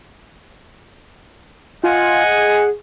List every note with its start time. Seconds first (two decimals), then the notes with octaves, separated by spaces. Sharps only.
1.84 F4 D#5 F#5 G#5
2.24 G#4